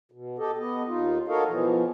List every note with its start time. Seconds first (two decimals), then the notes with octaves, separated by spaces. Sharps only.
0.12 B2
0.38 G4 A4 D#5
0.58 B3 D#5
0.88 D#2 D#4 F4
1.28 F#4 A4 A#4 C#5 D#5 F5
1.47 B2 E3 F3